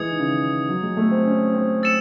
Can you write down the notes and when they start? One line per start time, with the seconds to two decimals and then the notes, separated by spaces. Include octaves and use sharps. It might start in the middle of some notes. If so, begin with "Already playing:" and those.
Already playing: E3 G#3 D#6 G#6 C#7
0.11 D#3
0.19 C#3
0.27 D#3
0.69 F#3
0.82 G#3
0.97 A3
1.11 C4
1.26 C#4
1.54 C4
1.83 E6 A6 C#7 E7